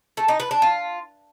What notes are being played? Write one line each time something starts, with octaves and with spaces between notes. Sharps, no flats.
A3
D#4
B4
D4
F4